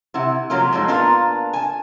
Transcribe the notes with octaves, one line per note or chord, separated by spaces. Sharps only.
C3 E4 F#5
C3 F3 F#3 A#3 C#4 F4
F2 G#3 C4 D#4
A#2 B3 D4 F4 A#4
G#5 A5